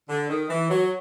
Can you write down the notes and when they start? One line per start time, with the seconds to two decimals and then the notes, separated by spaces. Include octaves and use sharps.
0.09 D3
0.29 D#3
0.49 E3
0.69 F#3